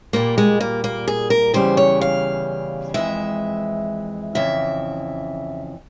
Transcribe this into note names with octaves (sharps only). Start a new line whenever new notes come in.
A#2 G3 A#3
G#3
A#3
A#3
G#4
A#4
E2 C#3 E3 G3 C5
C#5
F5
F2 E3 G#3 E5
F2 C#3 E3 E5